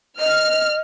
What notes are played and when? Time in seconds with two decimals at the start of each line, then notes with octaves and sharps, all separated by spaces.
0.20 D#5 F6